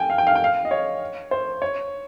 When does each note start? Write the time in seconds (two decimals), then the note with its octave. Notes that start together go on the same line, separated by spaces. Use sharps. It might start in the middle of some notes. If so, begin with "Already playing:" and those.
Already playing: G5 G#5
0.10 F5
0.18 G5
0.27 F5
0.35 G5
0.44 F5
0.65 D#5
0.71 C#5
1.31 C5
1.62 C#5